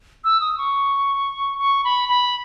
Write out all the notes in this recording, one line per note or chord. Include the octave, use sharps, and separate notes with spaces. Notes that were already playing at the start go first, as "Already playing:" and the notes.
E6
D#6
C#6
C#6
B5
B5